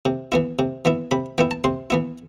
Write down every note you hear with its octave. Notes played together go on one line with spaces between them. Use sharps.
C3
E3 B3 E4
C3
E3 B3 E4
C3 B5
E3 B3 E4 G5
A5
C3 C6
E3 B3 E4